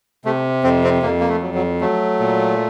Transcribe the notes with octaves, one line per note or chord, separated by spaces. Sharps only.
C3 A3
F2 C4
C4
F2 A#3
A#3
A3
F#3
F#3
F#3 A3
A#2